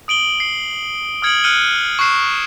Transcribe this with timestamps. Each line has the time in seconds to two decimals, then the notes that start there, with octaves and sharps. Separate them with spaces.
0.08 D#6 D7 F#7 G7
0.40 C7
1.22 D#6 F6 G#6 C#7 D7 F#7
1.44 F6 F#6 C#7 D#7 G7
1.99 C#6 F6 F#6 C7 E7